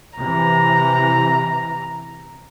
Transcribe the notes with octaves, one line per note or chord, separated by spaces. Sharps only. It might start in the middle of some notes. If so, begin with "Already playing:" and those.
C3 E3 A#5